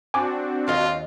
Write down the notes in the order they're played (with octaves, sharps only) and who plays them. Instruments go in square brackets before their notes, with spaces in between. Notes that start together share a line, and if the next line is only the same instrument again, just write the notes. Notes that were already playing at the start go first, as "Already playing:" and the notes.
[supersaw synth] C4 D4 F#4 [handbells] G#5 D6
[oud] D#2 D#5 [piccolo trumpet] F4